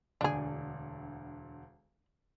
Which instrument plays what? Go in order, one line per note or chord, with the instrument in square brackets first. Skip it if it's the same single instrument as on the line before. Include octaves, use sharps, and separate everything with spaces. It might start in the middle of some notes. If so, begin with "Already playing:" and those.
[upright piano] E1 D2 D3 [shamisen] D4 G#4